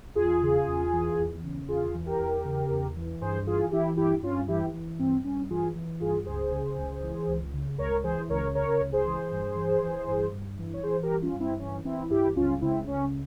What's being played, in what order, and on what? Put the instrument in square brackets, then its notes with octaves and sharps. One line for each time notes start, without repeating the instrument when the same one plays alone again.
[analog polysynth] E2 F4 G#4
C#3
E2
E3
E2
C#3
E2 F4 G#4
E3
G4 A#4
E2
C#3
E2
E3
G2 G#4 C5
E3 F4 G#4
E3 E4 G4
G2 E4 G4
G2 C#4 F4
E3 E4 G4
E3
G2 C4
G2 C#4
E3 F4 G#4
E3
G2 F4 G#4
C#2 G#4 C5
C#3
C#2
E3
C#2
C#3
C#2 A#4 C#5
E3 G#4 C5
C#2 A#4 C#5
C#3 A#4 C#5
C#2
G#4 C5
E3
G2
E3
E3
G2
G2
E3
C#5
E3 G#4 C5
G4 A#4
G2
C#4 F4
G2
C4 E4
E3 C#4
E3 C4 E4
G2 E4 G4
C#2 C#4 F4
C#3 C4 E4
C#2 C#4